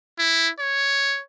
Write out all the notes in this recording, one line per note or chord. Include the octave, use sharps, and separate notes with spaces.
E4
C#5